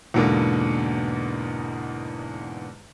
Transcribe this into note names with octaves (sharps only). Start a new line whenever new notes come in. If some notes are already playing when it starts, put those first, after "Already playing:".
E2 G#2 B2 D3 A#3